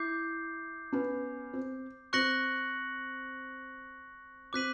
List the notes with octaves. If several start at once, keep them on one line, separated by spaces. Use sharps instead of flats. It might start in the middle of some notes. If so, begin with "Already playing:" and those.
Already playing: E4 D6 G6 C7
B3 C#4
C4
C4 C#6 F#6 A#6 C#7 F#7
C4 D6 F#6 B6 D#7 F#7